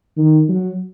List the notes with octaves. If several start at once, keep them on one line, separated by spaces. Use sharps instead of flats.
D#3
F#3